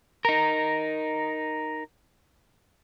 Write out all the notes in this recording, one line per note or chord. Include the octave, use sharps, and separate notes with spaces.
D#4 A#4